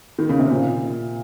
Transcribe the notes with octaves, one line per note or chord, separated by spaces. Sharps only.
D#3
C#3
C3
A#2